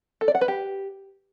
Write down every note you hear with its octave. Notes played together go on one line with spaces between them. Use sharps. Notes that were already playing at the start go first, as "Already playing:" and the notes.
A4
D5
F#5
B4
G4